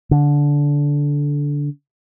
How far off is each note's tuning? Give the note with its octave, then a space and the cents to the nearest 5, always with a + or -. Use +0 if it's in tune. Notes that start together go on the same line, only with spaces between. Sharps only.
D3 -15